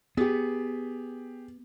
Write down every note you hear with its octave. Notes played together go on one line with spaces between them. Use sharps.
B3 G4 G#4